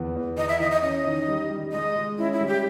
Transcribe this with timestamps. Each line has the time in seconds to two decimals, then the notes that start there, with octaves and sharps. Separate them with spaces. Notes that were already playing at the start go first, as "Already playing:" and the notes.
Already playing: E2 B3
0.16 E2
0.37 E3 D#5
0.49 E5
0.59 E3 D#5
0.71 D#5
0.82 C#4 D#5
1.05 D#3
1.28 G3
1.50 G3
1.72 G#3 D#5
1.95 G#3
2.18 C#4 E4
2.33 E4
2.41 G3
2.47 G4